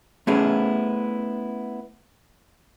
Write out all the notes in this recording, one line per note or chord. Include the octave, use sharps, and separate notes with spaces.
A3 B3 C#4 E4 G#4